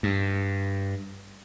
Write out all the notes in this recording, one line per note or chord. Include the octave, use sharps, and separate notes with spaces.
G2